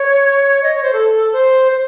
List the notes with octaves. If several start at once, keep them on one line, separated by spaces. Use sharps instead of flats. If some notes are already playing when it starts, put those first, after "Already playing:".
Already playing: C#5
D#5
C#5
C5
A4
C5
C5